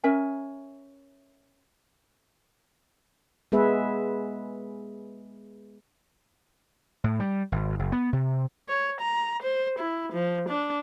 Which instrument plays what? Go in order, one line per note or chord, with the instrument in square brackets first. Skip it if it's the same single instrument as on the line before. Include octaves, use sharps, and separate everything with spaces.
[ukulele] C#4 A#4 E5 G#5
[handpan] G#3 B3 G#4 B4 E5
[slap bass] A2
G3
G#1
F#1
B3
C3
[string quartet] C#5
A#5
C5
E4
F3
D4